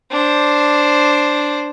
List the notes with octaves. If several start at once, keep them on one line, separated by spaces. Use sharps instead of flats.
D4 C5